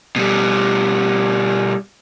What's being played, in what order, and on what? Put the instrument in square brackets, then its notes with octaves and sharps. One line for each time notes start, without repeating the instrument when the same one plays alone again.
[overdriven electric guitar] B2 G3